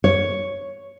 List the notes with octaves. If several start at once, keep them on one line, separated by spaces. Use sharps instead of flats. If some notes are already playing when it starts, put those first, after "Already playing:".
C#5